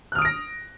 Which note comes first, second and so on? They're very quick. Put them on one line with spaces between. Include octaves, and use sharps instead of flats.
F#6 F6 D#6 D7 A#6